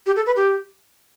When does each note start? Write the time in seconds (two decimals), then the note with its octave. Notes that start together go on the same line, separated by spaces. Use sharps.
0.06 G4
0.16 A4
0.26 B4
0.36 G4